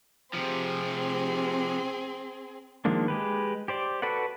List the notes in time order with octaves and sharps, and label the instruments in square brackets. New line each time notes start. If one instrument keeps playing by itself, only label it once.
[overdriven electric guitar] C3 F3 [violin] C4 G#4
[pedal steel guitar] D#3 F3 G#3 A#3 D4
G#3 G4 B4
G4 C5 D5
F#4 A4 B4 D5 F#5